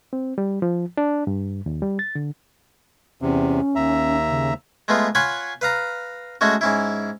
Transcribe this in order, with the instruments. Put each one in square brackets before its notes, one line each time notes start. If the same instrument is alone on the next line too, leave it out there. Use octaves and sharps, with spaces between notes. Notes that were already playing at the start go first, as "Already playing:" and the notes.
[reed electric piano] C4
G3
F3
D4
G2
D#2
G3
A6
D3
[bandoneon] E2 C3 [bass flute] C#4
[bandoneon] D#2 E5 A#5
[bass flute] C#3
[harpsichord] G#3 A3 B3 F4
F4 C#5 F#5 G#5 B5
B4 F5 A#5
G#3 A3 C#4 F#4
G#2 C#4 E4